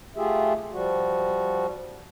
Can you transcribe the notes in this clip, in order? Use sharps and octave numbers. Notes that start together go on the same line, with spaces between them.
A3 F4 G4 G#4 E5
F3 G3 F#4